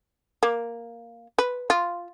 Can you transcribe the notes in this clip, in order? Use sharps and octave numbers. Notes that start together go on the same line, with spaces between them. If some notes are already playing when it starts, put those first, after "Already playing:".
A#3
B4
F4